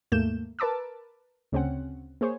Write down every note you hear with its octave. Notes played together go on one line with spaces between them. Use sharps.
D#2 G#2 A3 A#3 G6 E7
A#4 B4 A5 D6 E6
D2 C#3 C4 C#4 F#5
A#3 G#4 C5 C#5